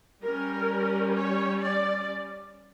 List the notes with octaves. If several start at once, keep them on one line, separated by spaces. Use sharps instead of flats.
G3 C#4 A#4
C#5
D5